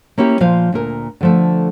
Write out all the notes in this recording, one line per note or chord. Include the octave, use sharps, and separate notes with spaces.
A#3 C#4 E4 G4
A#2 F3 C5 F5
D2 A#2 A#4
D3 F3 A3